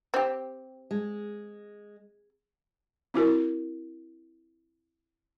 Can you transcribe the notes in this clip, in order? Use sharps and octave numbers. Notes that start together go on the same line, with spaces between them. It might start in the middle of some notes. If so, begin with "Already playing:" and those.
C4 G4
G#3
C4 E4 F#4 A#4